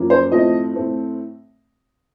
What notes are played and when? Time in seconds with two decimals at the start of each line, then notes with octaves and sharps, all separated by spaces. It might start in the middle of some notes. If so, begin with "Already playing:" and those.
Already playing: F#2 F3 A#3 C#4
0.10 C5
0.32 A2 F3 A3 C4 D#5
0.75 A2 A3 C4